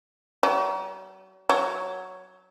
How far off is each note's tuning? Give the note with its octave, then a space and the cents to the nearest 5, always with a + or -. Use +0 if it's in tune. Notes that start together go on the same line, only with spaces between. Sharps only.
F#3 +40
F#3 +0